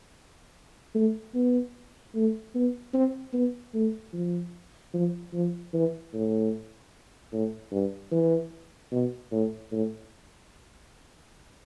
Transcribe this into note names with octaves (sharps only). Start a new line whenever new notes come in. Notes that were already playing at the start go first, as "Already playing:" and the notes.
A3
B3
A3
B3
C4
B3
A3
F3
F3
F3
E3
A2
A2
G2
E3
B2
A2
A2